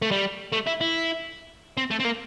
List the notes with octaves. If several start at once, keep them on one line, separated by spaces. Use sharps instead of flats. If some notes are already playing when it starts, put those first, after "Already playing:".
A3
G3
A3
E4
E4
C4
A3
C4
A#3